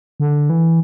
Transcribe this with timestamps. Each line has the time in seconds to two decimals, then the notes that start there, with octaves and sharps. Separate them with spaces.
0.20 D3
0.50 E3